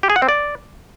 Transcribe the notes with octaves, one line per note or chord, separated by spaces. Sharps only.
G4
G#4
F#5
C4
D5